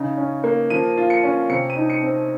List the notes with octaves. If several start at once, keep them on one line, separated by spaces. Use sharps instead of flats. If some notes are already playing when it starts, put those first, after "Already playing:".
Already playing: C#3 D#4
C#4
A#3
F3 D#7
F4
C#7
C#4
C3 C#7
D#7
D#4
C#7
C4